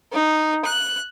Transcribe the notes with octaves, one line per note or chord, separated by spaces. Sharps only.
D#4
F#6